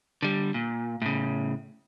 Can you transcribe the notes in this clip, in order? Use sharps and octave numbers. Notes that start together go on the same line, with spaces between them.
D3 G3
A#2
A2 C#3